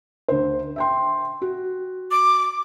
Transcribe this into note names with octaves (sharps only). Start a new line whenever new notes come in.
D2 C5
E5 G5 C6
F#4
D6